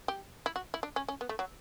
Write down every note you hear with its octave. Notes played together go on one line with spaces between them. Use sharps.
G4
E4
F#4
E4
D4
C#4
C#4
B3
A3
F#3